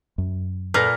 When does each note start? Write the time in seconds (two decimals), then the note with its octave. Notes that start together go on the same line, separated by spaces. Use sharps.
0.18 F#2
0.74 A#2 A4 B4 A#5 F6 A#6